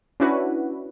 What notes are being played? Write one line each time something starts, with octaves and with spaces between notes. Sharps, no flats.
C#4 D4 E4 F#4 B4